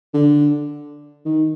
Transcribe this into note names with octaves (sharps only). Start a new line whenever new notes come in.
D3
D#3